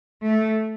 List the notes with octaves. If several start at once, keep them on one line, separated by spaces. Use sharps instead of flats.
A3